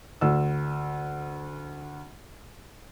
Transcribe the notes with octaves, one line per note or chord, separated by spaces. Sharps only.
D2 E6